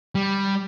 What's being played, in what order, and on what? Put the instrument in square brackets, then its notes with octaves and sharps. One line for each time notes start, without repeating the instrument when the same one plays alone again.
[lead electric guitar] G3